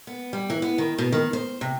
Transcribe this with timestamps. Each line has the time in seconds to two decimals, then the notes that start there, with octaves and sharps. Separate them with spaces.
0.07 B3
0.33 G3
0.50 E3
0.62 B3
0.78 D#3
0.98 B2
1.12 D#3
1.33 C5
1.61 C3